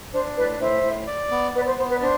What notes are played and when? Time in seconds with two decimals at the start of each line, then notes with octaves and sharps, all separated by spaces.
0.13 D4 C5
0.36 A2 B4 D5
0.60 A2 C5 E5
0.83 A2
1.07 D5
1.31 B3
1.54 B3 B4 D5
1.66 C5
1.78 B3 C5
1.89 B4
1.96 D5
2.02 D4 C5